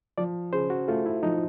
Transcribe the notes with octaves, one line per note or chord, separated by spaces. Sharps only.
F3 D5
C#3 C5
F#4
A3 F4
E4
F3 D#4